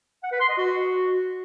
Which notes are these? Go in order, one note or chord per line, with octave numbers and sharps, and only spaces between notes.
F#5
B4
C6
D#5
F#4